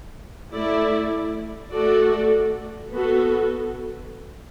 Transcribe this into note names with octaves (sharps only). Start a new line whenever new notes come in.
A3 E4 D5
A3 F#4 A4 D5
B3 F#4 A4